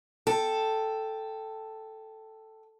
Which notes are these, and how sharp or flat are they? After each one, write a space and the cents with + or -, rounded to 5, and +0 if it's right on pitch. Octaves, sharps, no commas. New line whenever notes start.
A4 +0 G5 +0